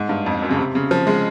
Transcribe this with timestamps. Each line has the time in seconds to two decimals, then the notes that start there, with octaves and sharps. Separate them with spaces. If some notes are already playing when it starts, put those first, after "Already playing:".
Already playing: G#2
0.09 G2
0.26 F2
0.42 F#2
0.51 C#3
0.58 C3
0.75 C#3
0.91 F3
1.07 G#3